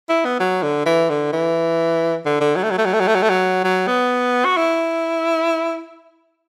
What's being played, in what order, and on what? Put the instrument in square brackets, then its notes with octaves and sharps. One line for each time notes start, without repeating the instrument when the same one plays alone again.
[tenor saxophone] E4
B3
F#3
D3
E3
D3
E3
D3
D3
F#3
A3
F#3
A3
F#3
A3
F#3
A3
F#3
A3
F#3
F#3
B3
F#4
E4